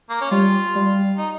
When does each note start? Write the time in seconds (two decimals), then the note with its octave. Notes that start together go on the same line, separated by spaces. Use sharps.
0.10 A#3
0.21 C#4
0.31 G3 F4
0.75 G3
1.18 D#4